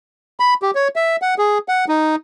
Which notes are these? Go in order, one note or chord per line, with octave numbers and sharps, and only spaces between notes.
B5
G4
C#5
E5
F#5
G#4
F#5
D#4